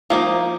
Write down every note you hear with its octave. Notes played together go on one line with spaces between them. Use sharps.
F3 A#3 D#4